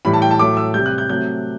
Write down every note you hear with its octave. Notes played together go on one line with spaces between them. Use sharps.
A2 E3 G3 B5
A5
G5
A5
A2 F#3 A3 D6
E6
C3 G3 G6
F#6
G6
C3 F#3 A3 G6